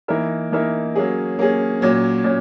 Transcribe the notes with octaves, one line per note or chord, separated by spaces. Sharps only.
E3 A#3 D#4 A#4 E5
E3 A#3 D#4 A#4 E5
F#3 A#3 C#4 G#4
F#3 A#3 C#4 G#4
A#2 F#3 C#4
A#2 F#3 C#4